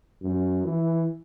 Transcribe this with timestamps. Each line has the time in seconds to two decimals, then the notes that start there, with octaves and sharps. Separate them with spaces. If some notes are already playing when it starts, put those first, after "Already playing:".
0.22 F#2
0.64 E3